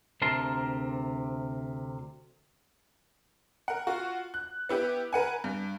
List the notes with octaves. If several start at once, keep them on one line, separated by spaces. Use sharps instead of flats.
D2 C3 A#4 A5 C6
A#4 F#5
F4 F#4
F#6
B3 E4 G4
A#4 B4 F#5 G#5
G2